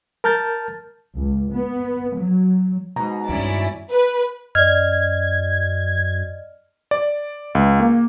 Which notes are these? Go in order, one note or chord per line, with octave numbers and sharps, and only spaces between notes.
A#4 A5 F6 G6 A6
C#2
B3
F#3
G#2 B2 A#5
G2 D#3 C#4 E4 D5
B4
F#2 D5 D#5 F6 G#6
D5
C#2
A#3